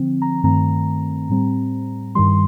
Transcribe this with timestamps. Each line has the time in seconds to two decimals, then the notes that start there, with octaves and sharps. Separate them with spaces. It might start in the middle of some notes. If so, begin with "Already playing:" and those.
Already playing: D3 F3 C4
0.22 A#5
0.43 G2 D#3 A3 C4 A#5
1.30 A2 G3 C4
2.15 G2 D#3 G3 C6